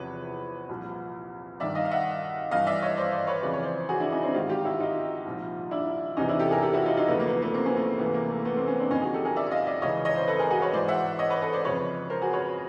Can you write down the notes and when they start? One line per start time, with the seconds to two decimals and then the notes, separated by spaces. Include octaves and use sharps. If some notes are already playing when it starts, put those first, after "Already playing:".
Already playing: E2 C3 F3 B4 C#5
0.69 C2 A#2 F3
1.60 G2 D#3 D5 E5
1.75 D#5 F5
1.85 F5
1.91 E5 F#5
2.51 G2 E3 D#5 F5
2.67 D5 E5
2.82 C#5 D#5
2.97 C5 D5
3.12 C5 D5
3.27 B4 C#5
3.43 F2 C#3 E3 D5
3.53 C#5
3.63 C5 D5
3.89 F#4 G#4
4.00 D4 E4
4.12 C#4 D#4
4.23 C4 D4
4.34 G#2 D#3 F4 G4
4.49 F4 G4
4.65 E4 F#4
4.80 D#4 F4
5.26 C2 A#2 F3
5.71 D4 E4
6.17 E2 C3 E3 C#4 D#4
6.28 D4 E4
6.39 G4 A4
6.51 G#4 A#4
6.62 G4 A4
6.73 E4 F#4
6.85 D#4 F4
6.97 D#4 F4
7.08 E2 C#3 F3 A3 B3
7.20 A#3
7.27 B3
7.31 A#3
7.42 A3 B3
7.54 A#3 C4
7.65 B3 C#4
7.76 A3 B3
7.99 C#2 C3 E3 A3 B3
8.14 A#3
8.30 A3
8.45 A3 B3
8.56 A#3 C4
8.67 B3 C#4
8.79 C4 D4
8.90 F2 D3 F3 C#4 D#4
9.02 F#4 G#4
9.13 G4 A4
9.25 G#4 A#4
9.36 D5 E5
9.51 D#5 F5
9.67 D5 E5
9.82 C#2 C#3 E3 C#5 D#5
10.05 C#5 D#5
10.16 C5 D5
10.27 A4 B4
10.39 G#4 A#4
10.50 F#4 G#4
10.62 B4 C#5
10.73 G#2 E3 C5 D5
10.88 E5 F#5
11.19 C#5 D#5
11.30 B4 C#5
11.41 A4 B4
11.53 C5 D5
11.64 F2 C#3 F3 B4 C#5
12.10 A#4 C5
12.22 F#4 G#4
12.33 B4 C#5